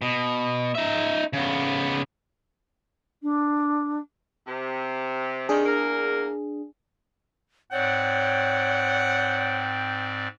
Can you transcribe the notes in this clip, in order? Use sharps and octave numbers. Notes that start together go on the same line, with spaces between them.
B2
D#4 E5
C#3 B3
D4
C3
C3 D#3 D4 G#4
E2 A#3 A#4
G#2 C4 C#5 D5 F#5 G5